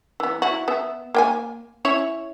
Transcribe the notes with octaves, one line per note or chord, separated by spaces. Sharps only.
E3 B3
E4 F#4
B3 E5
A#3 G5 G#5
C#4 E4 C#5